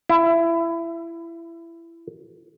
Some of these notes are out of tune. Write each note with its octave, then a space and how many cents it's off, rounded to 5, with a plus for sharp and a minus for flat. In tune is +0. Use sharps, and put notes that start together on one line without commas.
E4 +25